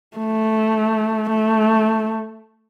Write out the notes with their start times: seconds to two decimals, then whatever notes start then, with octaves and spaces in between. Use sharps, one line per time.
0.17 A3
1.30 A3